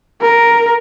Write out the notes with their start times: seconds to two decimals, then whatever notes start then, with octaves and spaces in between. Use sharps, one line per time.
0.22 A#4